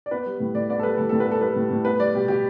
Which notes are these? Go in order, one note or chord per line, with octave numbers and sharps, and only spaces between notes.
D5
B3 B4
G3
A2
A2 D5
B3 D5
A4
G3 B4
A2 A4
A2 A4
B4
B3 A4
G3 B4
A2
A2
B3 B4
G3 D5
B2 G4
B2 G4